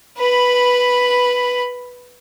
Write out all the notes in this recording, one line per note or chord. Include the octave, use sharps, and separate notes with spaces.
B4 B5